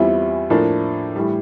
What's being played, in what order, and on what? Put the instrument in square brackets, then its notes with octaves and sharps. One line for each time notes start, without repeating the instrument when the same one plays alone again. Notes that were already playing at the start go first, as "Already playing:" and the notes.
Already playing: [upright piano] E2 E3 G3 C4 E4 F4
A2 F3 A#3 D4
A2 E3 G3